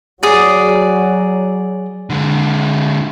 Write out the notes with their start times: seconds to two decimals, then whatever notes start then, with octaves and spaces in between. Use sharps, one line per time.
0.23 F#3 G#4 D5
2.10 D3 G#3